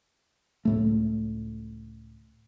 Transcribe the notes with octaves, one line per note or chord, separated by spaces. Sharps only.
C#2 A2 A3